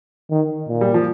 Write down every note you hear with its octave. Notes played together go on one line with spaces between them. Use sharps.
D#3
A#2
G3
F3